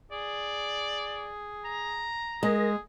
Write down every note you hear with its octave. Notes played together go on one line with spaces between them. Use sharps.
G#4 D5
A#5
G#3 G#4 A#4 A#6